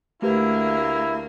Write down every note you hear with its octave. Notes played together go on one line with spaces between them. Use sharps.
D2 A3 A#3 E4 G4 B4